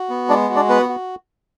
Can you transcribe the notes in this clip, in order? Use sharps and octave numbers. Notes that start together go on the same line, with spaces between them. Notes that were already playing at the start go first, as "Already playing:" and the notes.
Already playing: F#4
B3
G#3 D4 D5
F#4
D4 D5
B3 B4
F#4